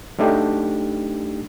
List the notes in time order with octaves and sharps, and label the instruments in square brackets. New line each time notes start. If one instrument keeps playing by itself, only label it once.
[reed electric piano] F#3 A3 D4 D#4 G4